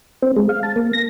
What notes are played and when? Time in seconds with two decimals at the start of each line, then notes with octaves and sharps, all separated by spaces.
0.22 C4
0.36 G#3
0.49 F5
0.63 A5
0.76 A#3
0.93 A#6